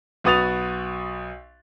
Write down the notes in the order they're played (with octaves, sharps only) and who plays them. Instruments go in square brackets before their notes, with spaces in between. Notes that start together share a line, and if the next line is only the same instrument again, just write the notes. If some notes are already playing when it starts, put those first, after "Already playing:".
[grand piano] B1 F#4 B4 D#6 A6 F7